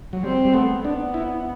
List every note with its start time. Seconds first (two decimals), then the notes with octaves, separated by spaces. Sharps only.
0.13 F#3
0.24 G3 C4
0.45 G3
0.54 A3 B3
0.84 B3 D4
1.14 E4